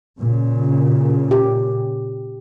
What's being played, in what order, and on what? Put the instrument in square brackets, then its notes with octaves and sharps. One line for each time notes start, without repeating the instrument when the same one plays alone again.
[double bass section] A#2 C#3
[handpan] G4